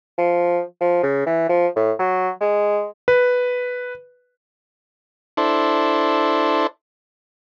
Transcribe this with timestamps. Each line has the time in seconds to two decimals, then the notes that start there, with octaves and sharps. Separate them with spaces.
0.18 F3
0.81 F3
1.03 C#3
1.26 E3
1.49 F3
1.76 A2
1.99 F#3
2.41 G#3
3.08 B4
5.37 D4 E4 A4 C5